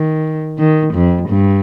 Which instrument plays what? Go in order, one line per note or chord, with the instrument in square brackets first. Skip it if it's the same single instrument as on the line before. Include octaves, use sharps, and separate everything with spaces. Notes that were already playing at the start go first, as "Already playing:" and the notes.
Already playing: [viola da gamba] D#3
D#3
F2
G2